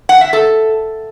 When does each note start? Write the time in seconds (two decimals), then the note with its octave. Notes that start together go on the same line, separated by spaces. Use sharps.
0.09 F#5
0.21 E5
0.33 A4